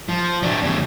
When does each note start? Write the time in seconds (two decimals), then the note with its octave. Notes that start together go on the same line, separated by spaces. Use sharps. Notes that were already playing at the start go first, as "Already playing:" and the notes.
0.09 F3
0.43 F#3 D4
0.62 E2 C#3